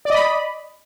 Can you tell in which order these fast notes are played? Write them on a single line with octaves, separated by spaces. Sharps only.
D5 D#5 B5